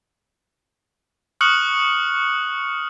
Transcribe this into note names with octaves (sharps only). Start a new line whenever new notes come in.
C#6 D#6 F6 F#6 C#7 F#7